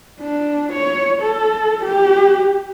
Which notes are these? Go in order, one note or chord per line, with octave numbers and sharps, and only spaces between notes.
D4
C#5
A4
G4